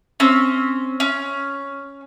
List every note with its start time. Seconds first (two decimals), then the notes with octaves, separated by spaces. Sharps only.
0.20 C4 C#4
1.00 C#4